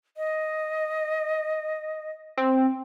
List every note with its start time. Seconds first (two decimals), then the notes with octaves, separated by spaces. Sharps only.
0.17 D#5
2.38 C4